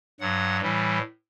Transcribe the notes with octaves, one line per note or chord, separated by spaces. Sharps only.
G2 F#3 F#5
A2 E3 G3